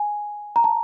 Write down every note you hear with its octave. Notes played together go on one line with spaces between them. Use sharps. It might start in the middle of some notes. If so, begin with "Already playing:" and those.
Already playing: G#5
A#5
A5